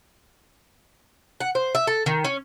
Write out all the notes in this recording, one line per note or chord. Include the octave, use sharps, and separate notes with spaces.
F#5
C5
E5
A4
D#3
C#4